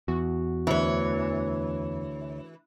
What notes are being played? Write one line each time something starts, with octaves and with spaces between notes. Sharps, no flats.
E2 F#4
D2 E3 C#5